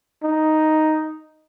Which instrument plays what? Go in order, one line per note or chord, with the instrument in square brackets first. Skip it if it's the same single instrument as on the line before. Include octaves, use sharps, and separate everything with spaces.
[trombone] D#4